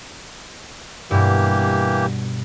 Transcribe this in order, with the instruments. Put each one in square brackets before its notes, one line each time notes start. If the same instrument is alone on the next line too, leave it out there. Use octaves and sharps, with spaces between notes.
[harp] G2 B2 [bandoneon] E3 A#3 G4